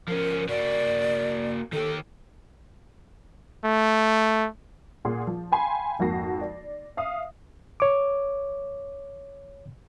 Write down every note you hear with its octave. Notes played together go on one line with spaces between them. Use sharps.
F3 C#4 A#4
A#3 F#4 D5
D#3 G4 A4
A3
A#2 G#4 F#5 C6
F3
F5 G5 G#5 B5 C6
G#1 F2 A#3 F#4 A#6 C7
D5
E5 F5 D#6
C#5 D6